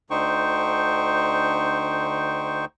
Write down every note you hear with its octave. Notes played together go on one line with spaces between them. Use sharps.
D2 D3 D#4 C5 G5 C#6